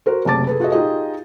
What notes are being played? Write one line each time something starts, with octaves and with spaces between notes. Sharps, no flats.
F#4 A#4 C5
F#1 C3 A3 A5 D6 A6
G#4 A4 B4
F4 F#4 G#4 A4 D#5
D#4 F4 G4 G#4 D#5